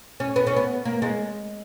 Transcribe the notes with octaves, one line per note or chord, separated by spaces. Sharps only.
C#4
B3
C#4
B3
A#3
G#3